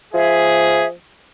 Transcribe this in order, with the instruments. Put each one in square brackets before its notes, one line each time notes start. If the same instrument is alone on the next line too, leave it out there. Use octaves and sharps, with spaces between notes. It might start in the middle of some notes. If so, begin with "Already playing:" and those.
[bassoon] F3 [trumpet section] G#4 [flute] E5